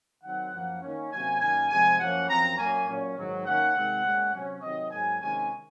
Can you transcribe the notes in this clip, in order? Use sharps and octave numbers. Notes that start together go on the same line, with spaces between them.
D#3 F#3 C4 F#5
F#2 F3 A#3
D#3 A#3 C#4
C3 F#3 A#3 C#4 G#5
F#2 D#3 A#3 G#5
C3 F3 G#3 G#5
F#2 F3 A#3 C#4 F#5
F#2 F3 C4 A#5
A#2 F#3 A#3 C#4 G#5
A#2 F#3 C#4
G#2 D#3 F#3
D#3 A#3 C#4 F#5
C3 D#3 G#3 C4
A#2 G#3 C#4
C3 F#3 C#4
C3 D#3 F#3 C4 D#5
G#2 F#3 A#3 G#5
C3 D#3 G#3 C#4 G#5